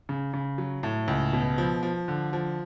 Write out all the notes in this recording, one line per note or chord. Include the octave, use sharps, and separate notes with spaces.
C#3
C#3
F#3
A2
C#2
B2
F3
F3
D3
F3